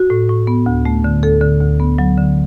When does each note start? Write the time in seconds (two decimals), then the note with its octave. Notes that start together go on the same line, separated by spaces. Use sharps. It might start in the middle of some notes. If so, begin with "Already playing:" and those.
Already playing: F#4
0.10 A2
0.29 A2
0.47 B3
0.66 D2
0.85 A3
1.04 D3
1.23 D2 A4
1.41 D3
1.61 D2
1.80 B3
1.98 F#3
2.17 D3